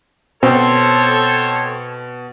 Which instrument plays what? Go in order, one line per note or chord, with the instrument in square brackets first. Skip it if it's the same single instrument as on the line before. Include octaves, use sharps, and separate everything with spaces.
[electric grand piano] B2 [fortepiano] C4 [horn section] A4 C5 C#5